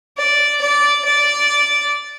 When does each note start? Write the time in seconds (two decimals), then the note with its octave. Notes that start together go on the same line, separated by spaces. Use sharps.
0.17 D5
0.61 D5
1.05 D5